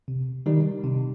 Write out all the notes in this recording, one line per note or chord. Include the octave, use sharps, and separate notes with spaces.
C3
D#3 G3 D#4
C3